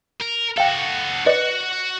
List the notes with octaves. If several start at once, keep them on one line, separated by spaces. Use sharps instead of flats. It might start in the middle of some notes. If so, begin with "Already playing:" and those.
A#4
F#4 A4 F5 G5
F#4 B4 D5 D#5 F#5